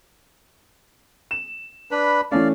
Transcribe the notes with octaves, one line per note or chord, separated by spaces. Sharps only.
E7
D4 B4 B5
E3 A3 C#4 D5 F5